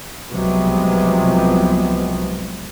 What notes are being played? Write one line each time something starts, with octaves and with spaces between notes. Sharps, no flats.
C2 C3 F3 F#3 G#3 B3